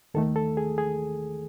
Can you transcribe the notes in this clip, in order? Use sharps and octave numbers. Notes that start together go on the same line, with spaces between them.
D#2 D#3 A3 A4
A4
G#4
G#4